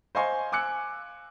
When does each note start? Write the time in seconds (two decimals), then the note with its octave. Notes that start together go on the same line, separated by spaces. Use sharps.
0.15 C5 D#5 F5 G#5 C6 C#6
0.52 G#5 D6 E6 F#6 C#7